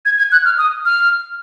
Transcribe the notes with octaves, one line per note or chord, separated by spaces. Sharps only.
G#6
G#6
F#6
F6
D#6
F6